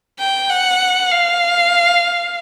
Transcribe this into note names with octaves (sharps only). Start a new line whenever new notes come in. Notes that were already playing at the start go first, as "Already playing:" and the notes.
G5
F#5
F5